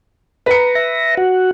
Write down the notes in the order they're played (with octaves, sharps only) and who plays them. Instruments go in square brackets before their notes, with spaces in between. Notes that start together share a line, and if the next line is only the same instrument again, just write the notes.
[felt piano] B4 C#7 [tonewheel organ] A#5
[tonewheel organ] E5 A#6
F#4 F#5